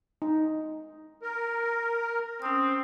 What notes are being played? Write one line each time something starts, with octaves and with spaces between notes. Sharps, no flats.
D#4
A#4
C4 C#4 D#6